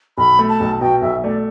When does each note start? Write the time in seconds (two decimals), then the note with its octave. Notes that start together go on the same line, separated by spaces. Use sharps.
0.18 B1 B5
0.39 A3
0.49 A5
0.60 B1
0.81 B2 G5
1.02 B1 E5
1.24 A3 D5